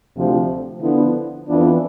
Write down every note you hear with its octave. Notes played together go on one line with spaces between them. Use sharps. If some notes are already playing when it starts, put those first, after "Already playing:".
D2 C3 F3 A3
D3 F3 B3 E4
F2 E3 B3 D4 F4